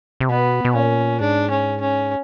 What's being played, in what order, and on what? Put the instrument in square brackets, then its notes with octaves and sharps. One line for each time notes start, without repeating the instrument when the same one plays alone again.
[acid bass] C3
[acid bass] B2 [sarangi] B3
[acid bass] B2
[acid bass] A#2 [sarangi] C#4
[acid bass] G#2 [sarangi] D4
[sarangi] C#4
C#4